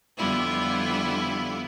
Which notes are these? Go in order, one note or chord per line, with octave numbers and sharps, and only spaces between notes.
F2 D3 G3 B3 E4 F4